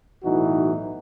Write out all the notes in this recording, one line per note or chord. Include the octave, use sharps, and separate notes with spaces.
B1 A2 E3 D#4 F#4